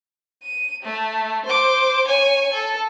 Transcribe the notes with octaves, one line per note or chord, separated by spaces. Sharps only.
D#7
A3
C5 D6
C#5 G#5
A4